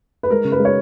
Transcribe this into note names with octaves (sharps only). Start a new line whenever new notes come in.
B4
G#3 A#4
C#3
B4
G#3
C#5